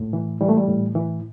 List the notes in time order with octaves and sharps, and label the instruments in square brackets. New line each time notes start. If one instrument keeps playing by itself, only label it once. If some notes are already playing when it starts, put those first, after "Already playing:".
Already playing: [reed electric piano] A2
E3
E3 G3
A3
G3
A2
E3